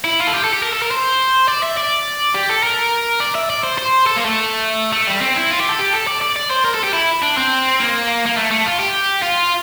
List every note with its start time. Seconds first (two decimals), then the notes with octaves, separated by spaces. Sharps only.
0.05 E4
0.20 F4
0.27 A4
0.34 G4
0.44 A4
0.53 G4
0.63 A#4
0.73 A4
0.82 A#4
0.91 C5
1.48 D5
1.63 E5
1.77 D5
2.35 G4
2.49 A4
2.63 A#4
3.20 D5
3.35 E5
3.50 D5
3.64 C5
3.78 C5
4.06 A4
4.16 A#3
4.25 A3
4.93 A3
5.07 G3
5.21 C4
5.36 E4
5.50 F4
5.60 G4
5.69 A4
5.79 G4
5.93 A4
6.07 D5
6.21 D5
6.36 D5
6.51 C5
6.65 A#4
6.75 A4
6.84 G4
6.94 E4
7.22 D4
7.37 C4
7.80 A#3
8.26 A#3
8.37 A3
8.51 A3
8.66 F4
8.80 G4
9.23 F4